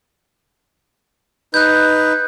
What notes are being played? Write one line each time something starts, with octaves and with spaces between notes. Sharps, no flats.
D#4 B4 F#6 G6